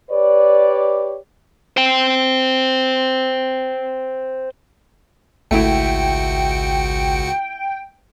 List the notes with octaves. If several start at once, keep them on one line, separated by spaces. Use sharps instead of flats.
G4 B4 C#5 D5
C5 G5
G#1 C#2 A3 E4 F#4 G5 C#7